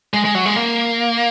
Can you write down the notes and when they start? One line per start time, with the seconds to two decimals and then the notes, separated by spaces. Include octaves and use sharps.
0.14 G#3
0.25 G#3
0.35 F#3
0.46 G#3
0.56 A#3